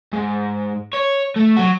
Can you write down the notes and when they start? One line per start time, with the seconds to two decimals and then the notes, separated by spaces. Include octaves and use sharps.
0.13 G#2
0.94 C#5
1.36 A3
1.57 F#3 F#4